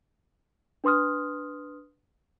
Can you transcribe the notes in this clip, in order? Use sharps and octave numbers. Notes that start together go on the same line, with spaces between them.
D4 B4 C6 D#6 F6